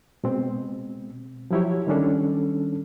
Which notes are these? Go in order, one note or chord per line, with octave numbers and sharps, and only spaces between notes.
B2 G#3 C4
F3 F#3 E4 G4 C#5
D#3 G3 C#4 D4 A4